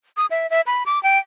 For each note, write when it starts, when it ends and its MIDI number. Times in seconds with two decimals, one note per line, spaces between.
0.17 0.26 87
0.31 0.49 76
0.50 0.61 76
0.67 0.83 83
0.86 1.01 86
1.03 1.18 79